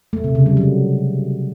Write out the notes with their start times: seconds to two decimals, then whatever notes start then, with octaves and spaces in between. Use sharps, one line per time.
0.13 A3
0.24 C3
0.35 C#3
0.46 G3
0.57 F#3